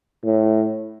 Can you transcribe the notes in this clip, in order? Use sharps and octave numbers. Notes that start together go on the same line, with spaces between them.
A2